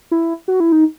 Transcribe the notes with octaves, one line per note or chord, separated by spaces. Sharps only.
E4
F#4
E4
D#4